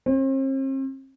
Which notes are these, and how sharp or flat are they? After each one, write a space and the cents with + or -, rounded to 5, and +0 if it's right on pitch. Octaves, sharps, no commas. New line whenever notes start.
C4 +45